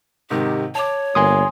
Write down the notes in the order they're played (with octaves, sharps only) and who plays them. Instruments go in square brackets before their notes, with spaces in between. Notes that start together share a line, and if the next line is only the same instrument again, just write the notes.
[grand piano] G#2 C3 D#3 [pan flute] G4
[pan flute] C#5 [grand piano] A5 D6
[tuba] G1 [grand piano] A#3 [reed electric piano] G#5 C6 D#6